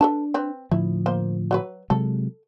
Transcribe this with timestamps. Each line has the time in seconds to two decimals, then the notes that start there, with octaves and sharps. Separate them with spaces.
0.01 D4 A4 B4 A5
0.34 C4 B4
0.71 A2 D3 F3 E4
1.06 A#3 C5
1.51 F#3 F#4 B4
1.90 C3 F#3 G#3 A4